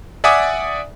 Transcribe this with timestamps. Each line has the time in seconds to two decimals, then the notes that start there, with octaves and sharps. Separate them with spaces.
0.24 D5 E5 F#5 G#5 D6 D#6